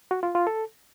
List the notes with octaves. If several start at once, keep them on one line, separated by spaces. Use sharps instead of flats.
F#4
F4
F4
A4